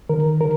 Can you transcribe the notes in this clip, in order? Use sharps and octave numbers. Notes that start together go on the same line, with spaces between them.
D#3 A#4
D#3 A#4